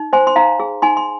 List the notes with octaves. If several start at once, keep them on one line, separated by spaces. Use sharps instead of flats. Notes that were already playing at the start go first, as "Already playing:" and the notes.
Already playing: D#4
C5 G#5 C6
C6
D#4 F5 A#5
G#4
D#4 G#5 C6
C6